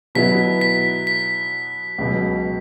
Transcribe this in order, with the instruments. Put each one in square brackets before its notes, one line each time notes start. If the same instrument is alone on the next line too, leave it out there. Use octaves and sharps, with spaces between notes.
[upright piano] B2 F#3 B3 E4 [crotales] B6
[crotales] B6
B6
[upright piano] C#2 B2 F#3